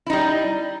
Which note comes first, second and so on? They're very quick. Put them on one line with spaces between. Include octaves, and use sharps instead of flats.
E4 D#4 G3